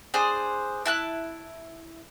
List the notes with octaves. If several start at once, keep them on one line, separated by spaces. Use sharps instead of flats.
D4 G#4 C5
E4 A5 F#6